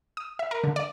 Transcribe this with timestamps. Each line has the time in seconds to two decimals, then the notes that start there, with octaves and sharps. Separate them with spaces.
0.17 D#6
0.39 E5
0.51 A#4
0.64 D3
0.76 D5